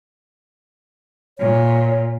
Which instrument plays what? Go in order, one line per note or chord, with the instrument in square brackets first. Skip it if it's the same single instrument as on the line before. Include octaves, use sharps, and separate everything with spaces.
[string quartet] A#2 [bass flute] C#5